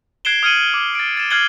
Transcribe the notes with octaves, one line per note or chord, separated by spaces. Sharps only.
F#6 G#6 C7 D7 E7 G7
D#6 F6 G#6 C#7 D#7 F#7
D6
A6 D7
A6 E7
F6 F#6 G#6 C7 F#7 G7